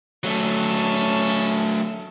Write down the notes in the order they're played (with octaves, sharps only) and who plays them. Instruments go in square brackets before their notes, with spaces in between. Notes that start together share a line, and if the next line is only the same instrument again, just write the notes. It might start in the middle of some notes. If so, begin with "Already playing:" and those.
[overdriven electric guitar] F#3 A3 [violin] C#4 A5